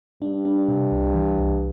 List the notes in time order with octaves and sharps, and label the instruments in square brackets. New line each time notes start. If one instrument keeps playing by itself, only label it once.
[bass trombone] G2 [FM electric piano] D4
[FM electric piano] D4
C3
C2
E3
C2